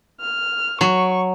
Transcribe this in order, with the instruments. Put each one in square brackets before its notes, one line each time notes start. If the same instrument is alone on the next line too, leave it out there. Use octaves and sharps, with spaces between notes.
[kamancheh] F6
[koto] F#3 [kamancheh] C#6